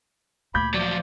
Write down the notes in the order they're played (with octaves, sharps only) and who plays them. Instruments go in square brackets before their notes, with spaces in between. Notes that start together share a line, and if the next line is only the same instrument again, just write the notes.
[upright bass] D2 A#2 [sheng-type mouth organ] B5 [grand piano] D6 G6 G#6
[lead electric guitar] F3 F#3 [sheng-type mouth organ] D5